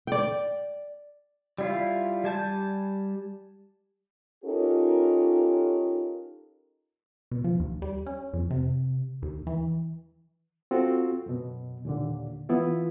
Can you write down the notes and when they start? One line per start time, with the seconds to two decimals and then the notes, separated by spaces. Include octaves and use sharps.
0.07 D5 G5
1.58 G3 E4 F4
2.24 G3 G#5 A5 G6
4.44 C#4 D#4 F4 G4 A4 A#4
7.31 B2
7.44 F3
7.60 D#2
7.82 G3
8.06 C#4
8.33 F2
8.50 C3
9.22 D#2
9.47 E3
10.71 C4 F4 F#4 A4
11.26 F#2 B2
11.85 D#2 A#2 D3
12.49 E3 B3 E4 F4